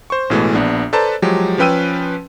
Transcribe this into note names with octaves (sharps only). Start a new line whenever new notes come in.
C5 C#6
A1 B2 E3 G#3 A3
A#1 B3 D4
A4 B4 C5 D5 A5 A#5
F3 F#3 G#3 G4
F3 C#4 B4 G5 E6 D#7